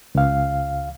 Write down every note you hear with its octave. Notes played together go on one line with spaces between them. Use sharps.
C#2 F5